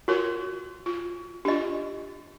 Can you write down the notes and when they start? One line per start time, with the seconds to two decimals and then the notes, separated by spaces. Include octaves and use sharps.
0.08 F4 F#4 A#4 C#5
0.86 F4
1.45 D4 F4 G4 D#5